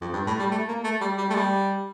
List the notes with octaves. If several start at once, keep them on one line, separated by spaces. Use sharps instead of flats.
F2
G2
A2
G3
A3
A#3
A3
G3
G3
A3
G3